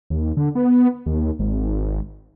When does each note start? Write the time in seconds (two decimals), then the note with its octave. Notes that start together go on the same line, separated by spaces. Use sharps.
0.10 D#2
0.37 D3
0.55 B3
1.06 D#2
1.39 G#1